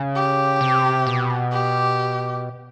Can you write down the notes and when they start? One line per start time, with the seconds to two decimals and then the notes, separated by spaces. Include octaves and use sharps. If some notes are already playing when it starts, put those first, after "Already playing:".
Already playing: C#3
0.16 G4
0.61 C3
1.07 B2
1.52 G4